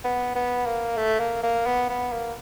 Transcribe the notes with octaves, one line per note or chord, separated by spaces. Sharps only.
B3
B3
A#3
A3
A#3
A#3
B3
B3
A#3